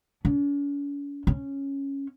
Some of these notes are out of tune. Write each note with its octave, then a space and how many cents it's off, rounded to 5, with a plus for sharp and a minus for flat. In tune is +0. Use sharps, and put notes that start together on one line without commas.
C#4 +45
C#4 -5